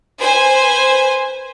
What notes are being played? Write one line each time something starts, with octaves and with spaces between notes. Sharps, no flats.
B4 C5 G#5